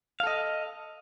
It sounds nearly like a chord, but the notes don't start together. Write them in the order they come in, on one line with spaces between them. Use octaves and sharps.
F5 A4 D#5